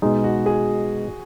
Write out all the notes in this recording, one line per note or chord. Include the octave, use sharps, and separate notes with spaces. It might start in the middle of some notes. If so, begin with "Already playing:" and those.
B2 G#3 D#4
F#4
G#4